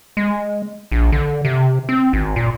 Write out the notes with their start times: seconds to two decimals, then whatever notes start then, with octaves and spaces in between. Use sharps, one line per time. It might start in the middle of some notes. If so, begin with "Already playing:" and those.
0.17 G#3
0.92 A#1
1.12 D3
1.45 C3
1.89 C4
2.13 G#1
2.36 A#2